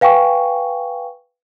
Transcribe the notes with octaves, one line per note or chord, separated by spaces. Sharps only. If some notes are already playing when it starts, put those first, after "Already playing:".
B4 F5 G5 G#5 C#6